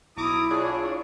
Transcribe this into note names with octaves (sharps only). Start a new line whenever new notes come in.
B1 E4 A#5 D6 D#6
D4 F4 G#4 C#5